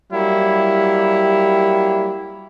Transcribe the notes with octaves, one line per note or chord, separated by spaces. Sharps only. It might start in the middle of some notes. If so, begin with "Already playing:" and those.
F#3 G3 A#3 E4